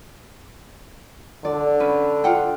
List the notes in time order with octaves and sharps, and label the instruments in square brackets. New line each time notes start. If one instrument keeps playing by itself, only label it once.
[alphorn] D3 [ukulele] D5
[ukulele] C#4 B4
F4 F#5 G5